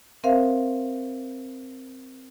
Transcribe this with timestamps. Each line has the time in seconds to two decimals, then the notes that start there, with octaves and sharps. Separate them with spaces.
0.24 C4 A#4 C5 E5 F5